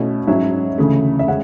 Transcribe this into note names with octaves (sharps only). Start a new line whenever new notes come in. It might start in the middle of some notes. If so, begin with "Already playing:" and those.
Already playing: B2 A3 C#4 E4
G#2 F#3 C#4 E4 E5
D2 C#3 E3 A3
E5
G#3 C#4 F#5